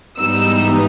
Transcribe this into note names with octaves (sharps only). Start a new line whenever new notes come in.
G#2 E3 G3 B3 D#4 E6